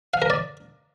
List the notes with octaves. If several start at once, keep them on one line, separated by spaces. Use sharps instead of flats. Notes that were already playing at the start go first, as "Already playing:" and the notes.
F5
A#4
D5